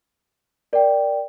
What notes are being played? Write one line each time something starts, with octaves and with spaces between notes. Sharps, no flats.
A#4 D5 G5